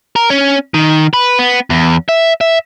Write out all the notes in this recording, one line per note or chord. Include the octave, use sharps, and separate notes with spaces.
A#4
C#4
D#3
B4
B3
E2
E5
E5